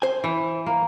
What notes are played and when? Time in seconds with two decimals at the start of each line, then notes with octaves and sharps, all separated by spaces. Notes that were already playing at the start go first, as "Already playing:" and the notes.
0.02 C5 G#5
0.24 E3
0.66 A#3